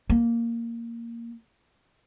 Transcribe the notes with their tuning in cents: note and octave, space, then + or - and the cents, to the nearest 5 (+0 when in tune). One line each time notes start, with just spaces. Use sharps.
A#3 -5